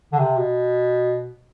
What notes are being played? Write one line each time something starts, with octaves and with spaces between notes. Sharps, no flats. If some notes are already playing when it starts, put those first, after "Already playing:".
D3
C3
B2